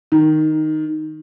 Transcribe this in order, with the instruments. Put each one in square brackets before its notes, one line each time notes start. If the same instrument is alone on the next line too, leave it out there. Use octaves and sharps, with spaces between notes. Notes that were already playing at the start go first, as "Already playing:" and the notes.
[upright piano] D#3